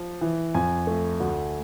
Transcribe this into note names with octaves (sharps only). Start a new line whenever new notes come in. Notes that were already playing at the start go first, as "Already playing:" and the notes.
Already playing: F3
E3
F2 G#5
A3
D2